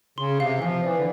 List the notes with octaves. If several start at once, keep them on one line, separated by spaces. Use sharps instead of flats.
C#3 C6
C3 F5
E3
F3 F5
E3 D5
D3